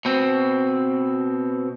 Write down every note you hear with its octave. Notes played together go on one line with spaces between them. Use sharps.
B2 C4